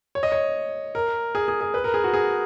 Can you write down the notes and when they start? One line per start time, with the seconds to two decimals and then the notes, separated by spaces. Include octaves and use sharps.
0.15 C#5
0.23 D#5
0.32 C#5
0.95 A#4
1.35 G#4
1.48 G#4
1.61 G#4
1.74 B4
1.84 A#4
1.94 G#4
2.04 F#4
2.13 G#4